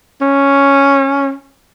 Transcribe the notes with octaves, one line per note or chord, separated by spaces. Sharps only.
C#4